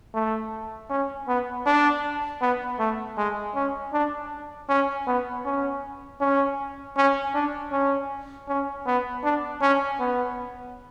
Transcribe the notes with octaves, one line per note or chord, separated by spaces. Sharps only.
A3
C#4
B3
D4
B3
A3
G#3
C#4
D4
C#4
B3
C#4
C#4
C#4
D4
C#4
C#4
B3
D4
C#4
B3